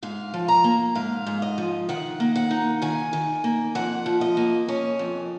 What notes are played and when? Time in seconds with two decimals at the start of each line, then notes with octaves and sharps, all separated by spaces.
0.03 G#2 F5
0.34 F3
0.48 A#5
0.64 A#3
0.95 G#2 F5
1.27 G#2
1.42 D#5
1.58 F3
1.89 D#3 F#5
2.20 A#3
2.36 F#5
2.51 D#4
2.82 D#3 G#5
3.13 D#3
3.44 A#3
3.75 F2 F#5
4.06 F3
4.21 D#5
4.37 A#3
4.68 C#4
4.99 F2